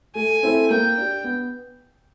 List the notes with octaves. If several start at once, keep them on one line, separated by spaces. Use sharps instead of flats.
A3 G#5
C4 E4 A4
A#3 G5
D4 G4
B3